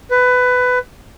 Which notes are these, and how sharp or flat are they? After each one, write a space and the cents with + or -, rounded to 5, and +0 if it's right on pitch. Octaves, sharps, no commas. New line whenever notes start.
B4 +15